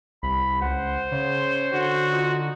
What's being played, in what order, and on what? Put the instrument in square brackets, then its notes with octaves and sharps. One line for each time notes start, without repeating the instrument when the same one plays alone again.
[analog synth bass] C2 [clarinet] B5
[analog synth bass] C#2 [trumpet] C5 [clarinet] F#5
[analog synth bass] C#3 [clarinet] C#5
[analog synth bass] D3 [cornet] F#4
[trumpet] D#4 [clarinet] F4